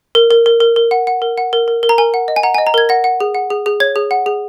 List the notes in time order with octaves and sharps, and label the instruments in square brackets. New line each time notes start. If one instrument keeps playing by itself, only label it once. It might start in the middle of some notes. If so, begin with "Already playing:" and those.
[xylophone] A#4
A#4
A#4
A#4
A#4
F#5
F#5
A#4
F#5
A#4
A#4
A#4
A#5
A#4 G#5
F#5
D#5
G#5
F#5 A#5
D#5 G#5
A#5
A#4 G#6
F#5 A#6
F#5
G#4
F#5
G#4
G#4
C#5 G#6
G#4
F#5
G#4